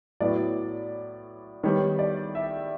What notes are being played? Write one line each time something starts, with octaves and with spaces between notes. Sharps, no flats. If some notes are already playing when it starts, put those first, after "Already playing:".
A2 F#3 B3 D5
D#3 G3 B3 C#5
D5
E5